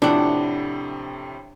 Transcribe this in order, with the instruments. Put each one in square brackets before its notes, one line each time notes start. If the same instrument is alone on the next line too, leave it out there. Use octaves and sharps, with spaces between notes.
[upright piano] F2 A2 C3 [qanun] D4 F#5